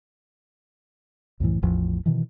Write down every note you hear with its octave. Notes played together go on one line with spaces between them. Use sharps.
C2 F#2 A2 E3
A1 E2 F3
B2 D#3 E3